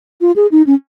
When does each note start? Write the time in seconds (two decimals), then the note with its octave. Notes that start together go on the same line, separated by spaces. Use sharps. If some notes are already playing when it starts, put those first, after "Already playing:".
0.21 F4
0.36 G#4
0.52 D#4
0.67 C#4